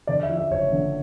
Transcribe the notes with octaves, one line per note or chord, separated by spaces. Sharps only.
D3 D5
E5
F3
E5
F#1 C#5
D3